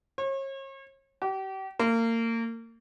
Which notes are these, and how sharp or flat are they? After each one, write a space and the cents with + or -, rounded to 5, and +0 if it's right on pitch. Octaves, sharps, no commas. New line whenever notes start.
C#5 -40
G4 -35
A#3 -30